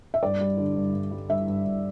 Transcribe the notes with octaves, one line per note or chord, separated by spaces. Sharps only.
E5
G2 D5
G3
D3
G2
G2
G3
G2 E5
G2
G2